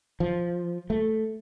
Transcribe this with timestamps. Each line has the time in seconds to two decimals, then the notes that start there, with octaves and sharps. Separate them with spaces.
0.20 F3
0.90 A3